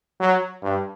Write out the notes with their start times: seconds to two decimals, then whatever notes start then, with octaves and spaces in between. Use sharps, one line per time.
0.20 F#3
0.62 G2